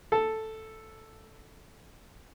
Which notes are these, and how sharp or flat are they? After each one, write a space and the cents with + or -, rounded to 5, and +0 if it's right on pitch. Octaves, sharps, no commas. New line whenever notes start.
A4 +0